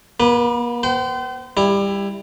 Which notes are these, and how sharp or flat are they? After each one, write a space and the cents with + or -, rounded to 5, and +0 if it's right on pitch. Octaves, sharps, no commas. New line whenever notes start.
A#3 +45 B4 +0
C5 -30 G5 -45
G3 +20 E4 +5